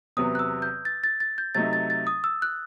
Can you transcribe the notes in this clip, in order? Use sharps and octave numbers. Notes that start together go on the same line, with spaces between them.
E2 C3 F#3 B3 D#6
F#6
E6
G6
A6
A6
A6
G6
C3 F#3 A3 D#4 A6
A6
A6
D#6
E6
F#6